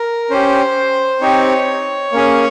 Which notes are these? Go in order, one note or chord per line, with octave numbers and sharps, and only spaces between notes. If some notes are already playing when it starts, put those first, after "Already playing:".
Already playing: A#4
C#4 G4 C5
C4 D#4 G4 C#5
A#3 C#4 G#4